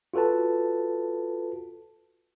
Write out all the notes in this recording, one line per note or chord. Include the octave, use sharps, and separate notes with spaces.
F4 F#4 A4 B4 A5